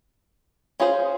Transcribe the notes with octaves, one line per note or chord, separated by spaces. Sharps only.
C#4 F4 G#4 C5